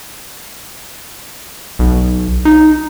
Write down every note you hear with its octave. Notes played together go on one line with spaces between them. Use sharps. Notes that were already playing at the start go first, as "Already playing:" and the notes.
B1
D#4